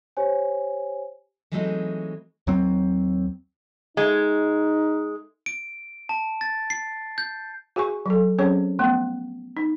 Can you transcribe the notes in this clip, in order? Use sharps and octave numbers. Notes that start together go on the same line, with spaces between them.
G4 C5 C#5 G#5
E3 F#3 G#3 A3 C4 D#4
D#2 F#3 C4
G#3 D#4
D7
A5
A6
C7
G6
F#4 G#4 G#5 C#6
F#3 A4
F#3 C4 C#4 G#4 C5 C#5
F3 A3 B3
D#4